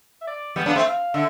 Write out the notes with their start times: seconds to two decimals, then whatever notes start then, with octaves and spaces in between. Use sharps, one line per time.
0.21 E5
0.27 D5
0.56 G3 B3
0.66 B3 D4 F5
0.76 A3 C4 E5
0.87 F5
1.14 D3 E5